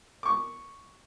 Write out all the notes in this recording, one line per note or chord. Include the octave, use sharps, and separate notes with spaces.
C#6 D6